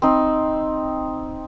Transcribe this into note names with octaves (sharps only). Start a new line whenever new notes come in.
C4 D#4